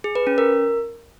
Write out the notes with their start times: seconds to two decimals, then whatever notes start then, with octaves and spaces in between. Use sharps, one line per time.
0.04 G#4
0.15 B4
0.27 C#4
0.38 A#4